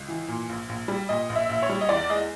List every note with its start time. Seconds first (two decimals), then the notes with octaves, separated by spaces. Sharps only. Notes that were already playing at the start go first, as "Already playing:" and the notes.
Already playing: C#2
0.08 E3
0.28 A#2
0.49 A#1
0.69 A#1
0.88 G3
1.09 A#2 D#5
1.30 A#1
1.35 E5
1.49 A#1
1.62 C#5
1.69 G3
1.81 D#5
1.89 E2 D5
2.09 G#3 D#5